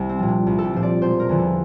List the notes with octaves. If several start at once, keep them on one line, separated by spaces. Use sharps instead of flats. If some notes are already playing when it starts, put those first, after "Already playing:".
Already playing: C2
C4
A#2 F3
D4
C2
A4
G4
A#2 F3 C5
D5
E1 C5
A#4
E2 D3 F3
A4